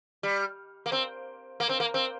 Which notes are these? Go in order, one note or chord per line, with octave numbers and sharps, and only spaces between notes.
G3
A#3
C4
A#3
C4
A#3
C4